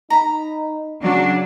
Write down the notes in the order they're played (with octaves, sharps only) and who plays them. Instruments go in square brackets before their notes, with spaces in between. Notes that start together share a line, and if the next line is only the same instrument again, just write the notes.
[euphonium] D#4 [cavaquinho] A#5 B5
[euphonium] C#3 [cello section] F#3 D4